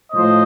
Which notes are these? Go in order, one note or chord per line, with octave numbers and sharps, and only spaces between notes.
A2 F3 C5 D#5